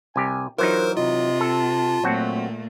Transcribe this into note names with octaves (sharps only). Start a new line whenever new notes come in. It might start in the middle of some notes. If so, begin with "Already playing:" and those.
C2 G4 G#5
E3 F#3 D#4 F4 A#4 C5
C3 F4 D#5
A4 A5
A#2 F#3 A3 C4 F#4